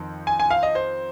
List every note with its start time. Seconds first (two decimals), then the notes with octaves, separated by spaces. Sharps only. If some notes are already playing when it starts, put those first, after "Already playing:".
Already playing: F2 D#3 C4
0.27 G#5
0.40 G#5
0.51 F5
0.63 D#5
0.75 C5